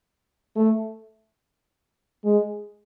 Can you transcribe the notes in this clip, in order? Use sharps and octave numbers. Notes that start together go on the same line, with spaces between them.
A3
G#3